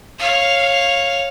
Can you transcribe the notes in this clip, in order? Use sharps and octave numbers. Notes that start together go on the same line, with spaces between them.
C#5 F5